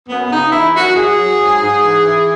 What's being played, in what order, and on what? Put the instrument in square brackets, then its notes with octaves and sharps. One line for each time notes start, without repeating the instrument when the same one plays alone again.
[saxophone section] F#2 B3
C#3 D#4
E3 E4
F#2 F#4
F#3 G#4
F#3
G#2
G#2
E3
E3